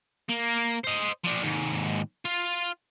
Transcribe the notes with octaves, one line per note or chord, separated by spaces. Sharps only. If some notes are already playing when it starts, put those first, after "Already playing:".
A#3
C5 D#5
F3 D4
D#2 G#2
F4